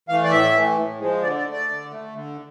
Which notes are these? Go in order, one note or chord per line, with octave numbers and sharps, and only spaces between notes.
E3 A3 F5
D5
A2 E5
E3 A3
A2
F3 G#3
D3 D5
D5
A3
D5
D3
A3
D3